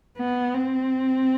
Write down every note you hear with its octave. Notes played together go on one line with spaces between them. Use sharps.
B3
C4